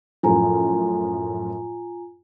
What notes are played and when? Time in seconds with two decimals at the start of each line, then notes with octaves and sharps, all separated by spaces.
0.23 F#2 A2 F3 F4 G#5 A#5